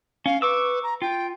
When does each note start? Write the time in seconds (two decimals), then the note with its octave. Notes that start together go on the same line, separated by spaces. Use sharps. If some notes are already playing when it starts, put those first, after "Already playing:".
0.26 C#4 F5
0.42 B4 C#6 D6 E6
0.83 A#5
1.02 F4 G5